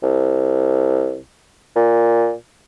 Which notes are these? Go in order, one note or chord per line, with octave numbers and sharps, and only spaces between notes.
C2
A#2